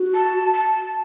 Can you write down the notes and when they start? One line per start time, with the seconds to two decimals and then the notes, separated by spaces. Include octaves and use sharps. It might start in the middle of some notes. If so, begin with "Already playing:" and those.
Already playing: F#4
0.14 A5
0.54 A5